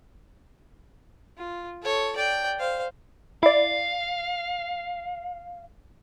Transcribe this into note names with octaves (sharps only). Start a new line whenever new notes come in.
F4
A4 C#5
D5 G5
C5 F5
E4 D5 F5